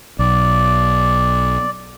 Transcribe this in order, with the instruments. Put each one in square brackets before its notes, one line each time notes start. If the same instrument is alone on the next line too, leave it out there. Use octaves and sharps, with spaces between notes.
[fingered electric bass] B1 [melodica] D5